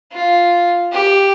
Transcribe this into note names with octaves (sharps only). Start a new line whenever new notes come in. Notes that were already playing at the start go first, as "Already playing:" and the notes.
F4
G4